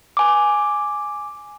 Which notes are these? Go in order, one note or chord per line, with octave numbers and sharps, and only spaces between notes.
G#5 D6